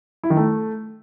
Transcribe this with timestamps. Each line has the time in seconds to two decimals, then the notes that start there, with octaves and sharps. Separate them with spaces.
0.23 E4
0.30 D#3
0.37 A3